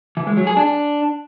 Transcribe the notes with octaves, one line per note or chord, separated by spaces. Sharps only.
E3
G#3
F#3
G#4
D4